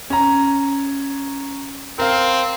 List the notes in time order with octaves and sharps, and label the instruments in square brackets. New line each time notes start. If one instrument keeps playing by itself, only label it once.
[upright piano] C#4 A#5
[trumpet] C4 [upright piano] A#4 F5